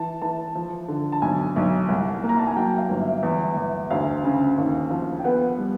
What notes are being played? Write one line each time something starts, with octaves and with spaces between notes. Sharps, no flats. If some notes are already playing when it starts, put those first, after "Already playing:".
Already playing: E3 A5
E3 A5
F3
D3
A5
B1 G#5
B1
C2
A#3
A#5
A5
G#5
F#3 G5
F5
G1
E5
E2
E2
D2 F5
C#3
D#2
F3
G5
B3 F#5
G3